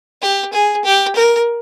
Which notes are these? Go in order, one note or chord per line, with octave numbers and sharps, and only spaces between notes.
G4
G#4
G4
A#4